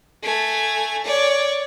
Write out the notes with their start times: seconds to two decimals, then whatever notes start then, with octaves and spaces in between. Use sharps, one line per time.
0.23 A3 G#5
1.04 C#5 D5